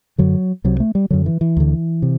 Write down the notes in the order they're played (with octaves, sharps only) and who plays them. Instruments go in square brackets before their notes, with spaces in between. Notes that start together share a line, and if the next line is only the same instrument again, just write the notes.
[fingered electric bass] F#2 D3 F#3
C2 C3 F#3
A3
G3
F#2 D3 F#3
E3
E3
D2 D3
C3